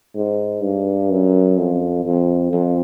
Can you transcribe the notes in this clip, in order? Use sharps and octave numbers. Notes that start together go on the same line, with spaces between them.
G#2
G2
F#2
F2
F2
F2